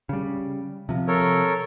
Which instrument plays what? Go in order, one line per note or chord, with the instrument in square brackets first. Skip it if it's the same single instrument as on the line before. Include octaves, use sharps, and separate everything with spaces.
[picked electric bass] C#3 G3
C3 F3
[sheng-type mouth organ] A4 A#4 C#5